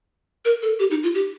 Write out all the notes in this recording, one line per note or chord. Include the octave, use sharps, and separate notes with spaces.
A#4
A4
G4
D#4
F4
G4